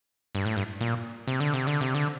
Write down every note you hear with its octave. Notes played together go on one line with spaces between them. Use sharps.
G2
A2
G2
A#2
C3
D3
C3
D3
C3
D3